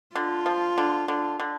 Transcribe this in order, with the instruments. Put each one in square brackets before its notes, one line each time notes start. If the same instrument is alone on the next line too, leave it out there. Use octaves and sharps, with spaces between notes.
[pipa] D3 [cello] F4
[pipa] F3
D3
D3
D3